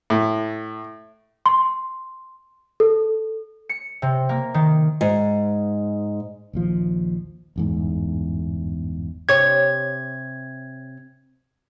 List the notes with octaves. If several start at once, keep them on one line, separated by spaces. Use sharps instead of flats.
A2
C6
A4
C#7
C3
A#3
D#3
G#2
A#1 D#2 F3
G1 E2 G#2
C3 C#5 G#6